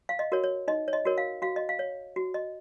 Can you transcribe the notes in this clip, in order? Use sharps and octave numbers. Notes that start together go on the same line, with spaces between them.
F5
D#5
F#4 A#4 C#5
C#5
D#4 D#5
C#5
D#5
F#4 A#4 C#5
F5
F#4 F5
D#5
F5
C#5
F#4
D#5